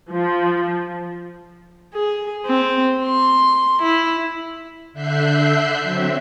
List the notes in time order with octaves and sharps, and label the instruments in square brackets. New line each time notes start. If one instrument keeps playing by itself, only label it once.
[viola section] F3
[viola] G#4
C4
C6
E4
[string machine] D3 E5 F#6 G6 C7
F#3 C4 E5